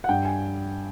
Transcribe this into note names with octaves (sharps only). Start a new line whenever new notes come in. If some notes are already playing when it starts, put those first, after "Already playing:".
F#5
G2 G5
G#5